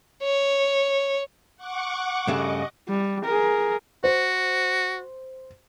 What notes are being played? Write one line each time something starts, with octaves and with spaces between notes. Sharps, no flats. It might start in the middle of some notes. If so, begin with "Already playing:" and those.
C#5
F#5 C#6 D6
G2 C#3 A3 D#5
G3
G#4 A#4
F#4 C5